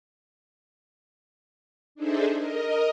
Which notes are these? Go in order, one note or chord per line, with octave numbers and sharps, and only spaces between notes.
D4 D#4 G#4 A4 C5 E5
A#4 D#5